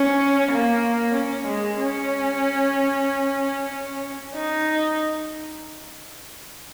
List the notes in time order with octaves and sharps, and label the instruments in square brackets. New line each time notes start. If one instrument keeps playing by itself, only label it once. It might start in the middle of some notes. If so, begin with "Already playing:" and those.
Already playing: [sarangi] C#4
A#3
C#4
G#3
C#4
D#4